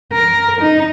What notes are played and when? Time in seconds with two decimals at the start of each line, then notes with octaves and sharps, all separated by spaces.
0.13 A#4
0.61 D#4